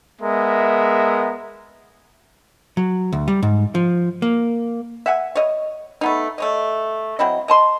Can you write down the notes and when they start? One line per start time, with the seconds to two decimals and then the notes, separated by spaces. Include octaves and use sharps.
0.22 G#3 B3 A#4 E5
2.77 F#3
3.12 D2
3.28 G3
3.42 G#2
3.75 F3
4.22 A#3
5.06 E5 F#5 G#5
5.36 C#5 D#5
6.01 A3 B3 D#4
6.38 A3 C#5 D#5
7.19 F#3 C4 E4 D#5
7.48 D#5 A5 C6